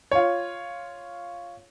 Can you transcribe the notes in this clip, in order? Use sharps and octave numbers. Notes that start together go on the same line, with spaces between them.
F4 C#5